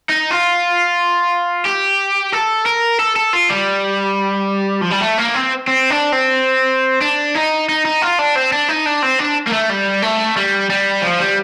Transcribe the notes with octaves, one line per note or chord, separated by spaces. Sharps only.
D#4
F4
G4
A4
A#4
A4
A4
F4
G3
F3
G3
A3
A#3
C4
C4
D4
C4
D4
D#4
D#4
D#4
F4
D4
C4
D4
D#4
D4
C4
D4
A#3
A3
G3
A3
G3
G3
F3
G3